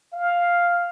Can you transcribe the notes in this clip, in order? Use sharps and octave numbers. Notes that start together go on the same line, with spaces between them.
F5